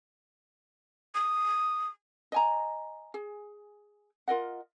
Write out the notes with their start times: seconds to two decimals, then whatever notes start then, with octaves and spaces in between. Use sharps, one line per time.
1.15 D#6
2.32 D#5 G#5 A#5
3.14 G#4
4.28 F4 A#4 D#5 F#5